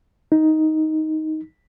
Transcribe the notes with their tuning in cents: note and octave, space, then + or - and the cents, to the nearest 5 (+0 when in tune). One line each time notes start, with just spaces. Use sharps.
D#4 +10